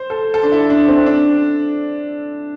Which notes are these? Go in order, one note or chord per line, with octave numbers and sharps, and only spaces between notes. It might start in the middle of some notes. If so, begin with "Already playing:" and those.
Already playing: C5
A4
A4
D4
E4
D4
C4
D4